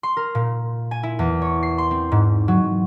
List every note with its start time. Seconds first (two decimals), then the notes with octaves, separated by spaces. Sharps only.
0.03 C6
0.17 A#4
0.35 A#2
0.91 G#5
1.03 E4
1.19 E2
1.42 C#5
1.63 C7
1.78 C6
1.91 C4
2.12 G#2
2.48 F#3